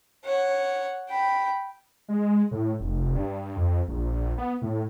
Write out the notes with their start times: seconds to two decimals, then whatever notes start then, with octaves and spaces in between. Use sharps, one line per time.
0.24 C#5 F#5
1.09 G5 B5
2.08 G#3
2.51 A2
2.80 F1
3.15 G2
3.56 F2
3.88 A#1
4.38 B3
4.62 A2